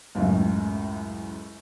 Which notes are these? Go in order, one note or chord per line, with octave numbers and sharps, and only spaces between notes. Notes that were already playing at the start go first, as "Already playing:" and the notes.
C#2 F#2 A2 C#3